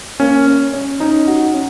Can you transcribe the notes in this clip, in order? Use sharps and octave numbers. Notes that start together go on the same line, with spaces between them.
A#3 C#4
C#4
C#4
C#4 D#4
F#4
C#4